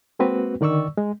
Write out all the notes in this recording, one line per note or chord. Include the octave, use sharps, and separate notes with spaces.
G#3 A#3 C4 F#4 B4
D3 D#3 D5 C#6 E6
G#3